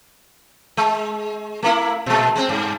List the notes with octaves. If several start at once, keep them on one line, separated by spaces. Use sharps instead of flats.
G#3
A3 A#3 E4
A#2 G#3
G#3 C4
G2